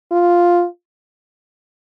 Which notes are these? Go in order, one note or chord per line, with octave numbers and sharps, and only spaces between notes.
F4